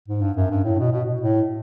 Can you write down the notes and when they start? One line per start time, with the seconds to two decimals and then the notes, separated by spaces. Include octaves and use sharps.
0.08 G#2
0.21 G2
0.36 F#2
0.50 G2
0.64 A2
0.79 B2
0.92 B2
1.21 A2